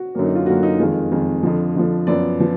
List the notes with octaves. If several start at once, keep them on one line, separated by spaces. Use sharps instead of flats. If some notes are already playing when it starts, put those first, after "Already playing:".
Already playing: F#4
F#2 D3 F#3 A#3
D#4
F4
F#2 D3 F#3 A#3 F#4
D#4
F2 D#3 G#3 F4
F2 D#3 G#3
F2 D3 F3
F2 D3 F3
F#2 F3 B3 D5
F3 B3